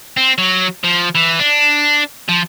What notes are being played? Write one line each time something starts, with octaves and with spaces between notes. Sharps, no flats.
C4
F#3
F3
E3
D4
F3